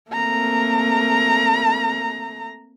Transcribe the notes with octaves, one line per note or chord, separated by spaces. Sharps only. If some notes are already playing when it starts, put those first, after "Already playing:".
A3 A#3 C4 A#4 A#5